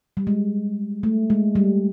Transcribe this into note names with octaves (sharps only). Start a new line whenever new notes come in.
G3
G#3
A3
G#3
G3